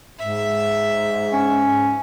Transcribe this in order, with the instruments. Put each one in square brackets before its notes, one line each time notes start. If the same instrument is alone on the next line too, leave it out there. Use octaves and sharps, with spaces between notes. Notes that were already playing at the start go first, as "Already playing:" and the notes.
[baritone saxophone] G#2 [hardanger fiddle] E5
[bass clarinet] C#4